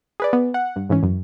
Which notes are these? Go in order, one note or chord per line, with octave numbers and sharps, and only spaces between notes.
G#4 B4 D5
B3
F#5
G2
G#2 E3 C#4
F#2